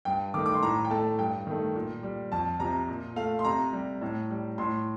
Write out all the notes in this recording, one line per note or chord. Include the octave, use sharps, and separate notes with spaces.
G2 G5
D#3 A3 D6
D6
C6
A2 A#5
G5
A3 A5
G2 G5
D#3 A3
A#2
G3
F2 A5
C3 F3 A#5
A#2
A3 F5
C6
C3 A#5
G3
A2
G3
A2 C6